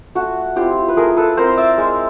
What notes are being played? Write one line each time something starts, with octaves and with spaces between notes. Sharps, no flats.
A3 F#4
C4 E4 F4 G4
B4
A3 G#4 A#4
A4 B4
C4 E4 A#4 C5
D5 E5
G#3